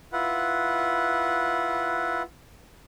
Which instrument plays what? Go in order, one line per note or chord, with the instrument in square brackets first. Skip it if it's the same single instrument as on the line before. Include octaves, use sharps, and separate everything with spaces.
[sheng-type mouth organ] E4 F4 B4 F#5